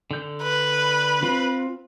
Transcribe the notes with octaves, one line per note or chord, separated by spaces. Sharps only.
D3 G6
B4
C4 F4